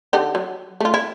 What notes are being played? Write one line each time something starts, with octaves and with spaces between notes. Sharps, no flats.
D3 D#4 G4
F#3
A3 F4
E4